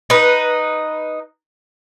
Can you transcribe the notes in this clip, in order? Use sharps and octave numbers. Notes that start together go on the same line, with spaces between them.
D#4 B4